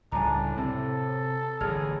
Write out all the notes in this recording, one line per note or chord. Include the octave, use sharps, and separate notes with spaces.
C#2 A2 C#3 G3 D4 G#5 A#5
C3 C4 A4
A1 G2 D3 G#4 F6 G#6 F7